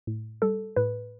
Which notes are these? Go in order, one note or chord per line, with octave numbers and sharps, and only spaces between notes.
A2
G3 A4
A2 B4